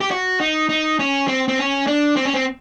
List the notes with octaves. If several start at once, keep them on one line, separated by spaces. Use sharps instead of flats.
G4
F#4
D#4
D#4
C#4
C4
C4
C#4
D4
C4
C#4
C4